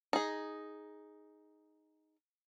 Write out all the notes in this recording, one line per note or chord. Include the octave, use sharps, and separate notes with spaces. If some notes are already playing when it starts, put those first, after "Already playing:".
D#4 G#4